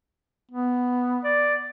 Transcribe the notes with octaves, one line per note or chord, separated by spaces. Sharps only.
B3
D5